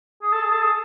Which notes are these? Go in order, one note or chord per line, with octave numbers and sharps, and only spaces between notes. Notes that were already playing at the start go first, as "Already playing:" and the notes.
G#4
A4
G#4
A4
G#4